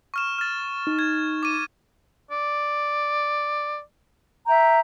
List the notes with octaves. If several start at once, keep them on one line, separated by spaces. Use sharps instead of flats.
C#6 F6 E7
F6 A6
D#4
G#6
D6 D#7
D5
E5 G5 A#5